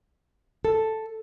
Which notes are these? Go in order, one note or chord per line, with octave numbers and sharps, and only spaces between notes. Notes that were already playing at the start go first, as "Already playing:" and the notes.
A4